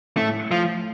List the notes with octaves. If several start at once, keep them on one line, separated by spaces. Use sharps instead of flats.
A2 A3
F3